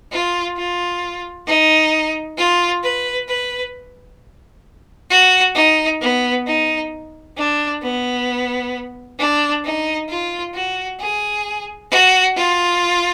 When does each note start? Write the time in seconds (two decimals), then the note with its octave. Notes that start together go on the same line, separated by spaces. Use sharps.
0.12 F4
0.57 F4
1.47 D#4
2.38 F4
2.83 B4
3.28 B4
5.10 F#4
5.55 D#4
6.01 B3
6.46 D#4
7.37 D4
7.82 B3
9.19 D4
9.64 D#4
10.09 F4
10.54 F#4
11.00 G#4
11.91 F#4
12.36 F4